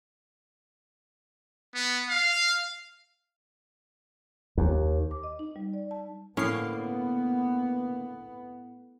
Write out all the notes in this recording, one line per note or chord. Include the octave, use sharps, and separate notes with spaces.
B3
F5
D#2
D6
D#5
D#4
G3
D5
A5
A2 D3 A#3 B3 C#4 F5 C7